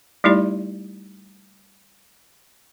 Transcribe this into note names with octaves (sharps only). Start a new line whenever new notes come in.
G3 A3 D#4 E4 G4 D5